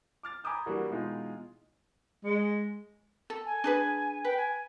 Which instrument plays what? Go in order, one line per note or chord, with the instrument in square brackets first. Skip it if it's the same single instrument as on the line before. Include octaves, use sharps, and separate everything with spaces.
[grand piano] D6 F6 A6
G#5 A#5 B5 D6 D#6 G6
E3 G3 A#3 D4 F#4
B2 E3 G#3 D#4 F4
[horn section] G#3
[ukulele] A4
[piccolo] G#5
[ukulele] D4 G#4 B4
[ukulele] B4 [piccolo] G5
[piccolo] G#5